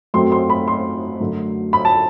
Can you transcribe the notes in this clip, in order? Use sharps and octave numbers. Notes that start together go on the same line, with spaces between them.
F#2 F#3 A3 C4 C6
C6
B5
C6
F#2 D3 F#3 A3
B5
A5